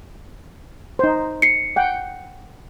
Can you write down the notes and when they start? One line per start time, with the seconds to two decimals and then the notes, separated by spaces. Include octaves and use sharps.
0.99 D#4 C5
1.42 C7 C#7
1.76 F#5 G5